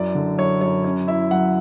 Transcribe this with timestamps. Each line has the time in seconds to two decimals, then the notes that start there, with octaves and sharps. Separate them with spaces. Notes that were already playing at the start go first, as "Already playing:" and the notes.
Already playing: F#2 E4 D5
0.15 D3
0.38 F#2 C#5
0.61 F#2 C#5
0.84 C#4 C#5
1.07 E4 E5
1.31 F#3 F#5